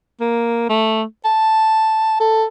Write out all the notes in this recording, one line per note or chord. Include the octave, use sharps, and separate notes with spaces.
A#3
A3
A5
A4